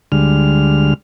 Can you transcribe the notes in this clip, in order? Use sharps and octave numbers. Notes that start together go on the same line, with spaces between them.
D2 D3 G3 G#3 F6